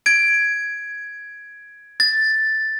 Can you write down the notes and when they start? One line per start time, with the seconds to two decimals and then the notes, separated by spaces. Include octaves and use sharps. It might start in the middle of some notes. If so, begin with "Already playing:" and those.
0.06 G#6 D7
2.00 A6